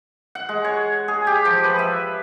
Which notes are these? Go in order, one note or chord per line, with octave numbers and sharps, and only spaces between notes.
F#5
G#3
C#5
G#4
G4
F3
B4
E5